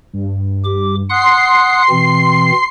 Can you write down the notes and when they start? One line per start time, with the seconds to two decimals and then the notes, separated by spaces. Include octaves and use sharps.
0.13 G2
0.64 G4 D6
1.10 F#5 C6 D#6 F#6 C7
1.90 B2 E3 C4